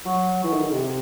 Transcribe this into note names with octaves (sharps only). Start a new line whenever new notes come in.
F#3
E3
D#3
D#3
C3